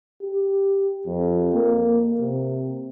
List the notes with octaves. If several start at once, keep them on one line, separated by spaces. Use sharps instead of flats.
G4
F2
A#3
C3